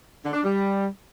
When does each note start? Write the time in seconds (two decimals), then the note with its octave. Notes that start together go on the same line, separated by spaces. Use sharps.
0.23 D3
0.33 D4
0.43 G3